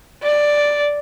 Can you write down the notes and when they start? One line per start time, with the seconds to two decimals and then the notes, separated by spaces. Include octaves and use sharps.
0.22 D5